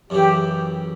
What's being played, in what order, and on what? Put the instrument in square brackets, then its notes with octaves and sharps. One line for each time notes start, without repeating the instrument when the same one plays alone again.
[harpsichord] F#2 C#3 E3 [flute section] G4